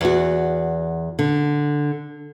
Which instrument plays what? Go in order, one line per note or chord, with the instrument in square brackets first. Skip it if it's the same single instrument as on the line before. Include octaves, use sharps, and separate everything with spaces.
[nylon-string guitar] E2 F#4
D3